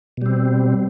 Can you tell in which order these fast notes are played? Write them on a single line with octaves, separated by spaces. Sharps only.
B2 G3 C4